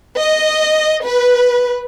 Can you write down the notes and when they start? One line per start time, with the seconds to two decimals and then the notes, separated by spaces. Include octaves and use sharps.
0.17 D#5
1.03 B4